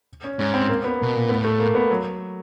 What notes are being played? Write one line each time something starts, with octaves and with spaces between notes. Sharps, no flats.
C#4
G#2 C#4
C4
A#3
B3
B2 A#3
A#2
A2 B3
A3
A#3
B3
F#3